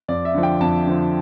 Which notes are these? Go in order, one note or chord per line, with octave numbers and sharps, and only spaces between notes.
F2 D5
E5
D3 F3
G5
F2 A5
D3 F3